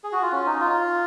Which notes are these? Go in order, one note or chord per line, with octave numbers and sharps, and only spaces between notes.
G#4
F#4
F4
C#4
D#4
F4